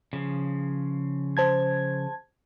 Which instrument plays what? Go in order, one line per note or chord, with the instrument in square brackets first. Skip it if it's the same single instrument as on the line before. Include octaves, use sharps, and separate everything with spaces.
[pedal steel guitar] C#3 F3
[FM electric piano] C5 A5 G#6